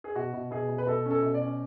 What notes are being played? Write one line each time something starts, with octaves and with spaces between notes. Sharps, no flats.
G#4
B2 F#4
B2
B2 G#4
B2
B4
B2 A4
C#4 A4
B2
D5
C#4